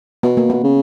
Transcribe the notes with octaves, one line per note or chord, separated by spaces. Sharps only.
B2 B3
A#3
B2 B3
C#3